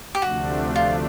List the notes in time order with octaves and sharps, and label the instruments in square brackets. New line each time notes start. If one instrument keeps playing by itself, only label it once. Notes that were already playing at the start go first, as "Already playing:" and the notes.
[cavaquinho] G4
[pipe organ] D2 C3 F3 A3 D4 [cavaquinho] F#4
[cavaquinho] F4